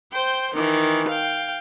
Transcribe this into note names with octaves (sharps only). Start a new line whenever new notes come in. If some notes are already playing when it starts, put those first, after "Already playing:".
C5 G5
D#3 E3
F5 G5